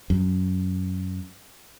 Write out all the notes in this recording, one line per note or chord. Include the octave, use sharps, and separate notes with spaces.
F#2